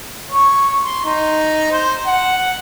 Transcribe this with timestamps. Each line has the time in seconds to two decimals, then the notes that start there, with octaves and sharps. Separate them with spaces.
0.31 C#5
0.83 C6
1.05 D#4
1.71 C5
2.06 F#5